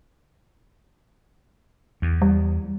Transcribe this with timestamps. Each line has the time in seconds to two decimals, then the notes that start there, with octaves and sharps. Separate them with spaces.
2.02 E2
2.22 G3